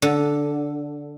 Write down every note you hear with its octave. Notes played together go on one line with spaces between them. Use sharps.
D3